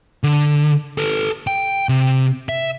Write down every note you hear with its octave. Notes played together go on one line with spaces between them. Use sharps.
D3
A4 B4
G5
C3
E5